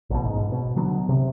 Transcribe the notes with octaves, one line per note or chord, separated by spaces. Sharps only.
A1 B2
G#2
B2
D3 F#3 B3
C3